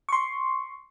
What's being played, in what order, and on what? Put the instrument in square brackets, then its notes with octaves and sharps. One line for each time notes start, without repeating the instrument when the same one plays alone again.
[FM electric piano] C6 C#6